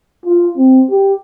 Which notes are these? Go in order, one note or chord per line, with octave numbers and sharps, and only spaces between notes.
F4
C4
G4